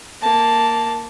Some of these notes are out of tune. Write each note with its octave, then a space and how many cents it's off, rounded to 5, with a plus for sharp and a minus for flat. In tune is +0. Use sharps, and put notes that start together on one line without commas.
A#3 +0 A5 +0